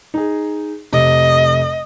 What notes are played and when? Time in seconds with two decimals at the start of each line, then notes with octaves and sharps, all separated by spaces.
0.14 D#4 G#4
0.93 F1 C3 D#5